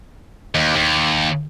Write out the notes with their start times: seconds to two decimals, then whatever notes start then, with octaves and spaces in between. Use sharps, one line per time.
0.55 D#2
0.76 D#2